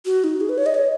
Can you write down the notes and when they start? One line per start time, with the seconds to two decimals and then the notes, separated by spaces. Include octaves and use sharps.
0.06 F#4
0.24 D#4
0.41 G#4
0.49 B4
0.58 C#5
0.66 D#5
0.74 C#5